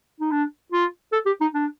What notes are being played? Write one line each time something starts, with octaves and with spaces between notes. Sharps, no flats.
D#4
D4
F4
A4
G4
D#4
D4